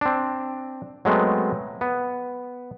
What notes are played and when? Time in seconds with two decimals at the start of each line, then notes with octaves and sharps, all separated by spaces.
0.01 C4 D4
1.05 F#3 G#3 A3 B3 C4
1.81 B3